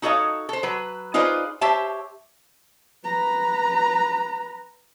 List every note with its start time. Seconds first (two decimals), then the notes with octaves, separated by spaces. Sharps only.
0.02 D#4 F#4 A4 C#5 D#5 F5
0.49 A4 C5
0.63 F#3 B4
1.14 D#4 F4 G#4 B4 C5 D5
1.61 G4 C5 C#5 E5 A5
3.04 B4 A#5